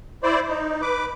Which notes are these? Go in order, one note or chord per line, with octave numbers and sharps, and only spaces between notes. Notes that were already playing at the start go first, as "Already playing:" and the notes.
E4 C5 D5
D#4
B4 D6